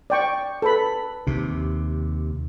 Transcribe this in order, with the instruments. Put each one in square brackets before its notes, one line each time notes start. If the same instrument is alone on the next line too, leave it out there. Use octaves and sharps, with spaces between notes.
[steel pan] D5 G5 C#6
A4 B4 B5
[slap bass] D#2 C3